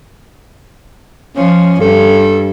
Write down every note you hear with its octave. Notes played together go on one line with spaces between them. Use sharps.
F3 C#4
G2 A4